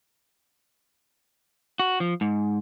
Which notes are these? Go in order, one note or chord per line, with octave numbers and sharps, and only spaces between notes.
F#4
F3
G#2